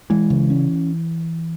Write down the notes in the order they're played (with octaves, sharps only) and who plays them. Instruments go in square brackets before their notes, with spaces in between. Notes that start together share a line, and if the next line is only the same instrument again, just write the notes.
[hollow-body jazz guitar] E3 [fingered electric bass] G#3
[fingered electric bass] C#3
C#4